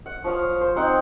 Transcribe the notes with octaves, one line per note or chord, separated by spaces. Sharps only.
F#5
F3 C#5 F5 D#6
C5
C4 D#4 F#5 G5